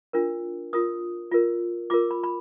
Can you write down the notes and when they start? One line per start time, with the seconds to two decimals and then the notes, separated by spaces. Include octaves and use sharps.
0.13 D4 F4 A#4
0.73 F4 A#4 D#6
1.31 F4 A#4
1.90 F4 A#4 D6
2.11 B5
2.23 B5